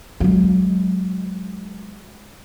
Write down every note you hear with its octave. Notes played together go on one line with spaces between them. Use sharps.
F#3 G#3